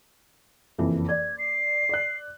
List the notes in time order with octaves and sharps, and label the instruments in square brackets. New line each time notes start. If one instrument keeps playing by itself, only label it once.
[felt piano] F#1 F2 E3
[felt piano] D5 [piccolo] G#6
[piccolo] C7
[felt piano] D5 F#6